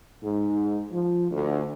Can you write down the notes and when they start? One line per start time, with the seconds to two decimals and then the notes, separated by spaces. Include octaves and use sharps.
0.22 G#2
0.91 F3
1.31 D2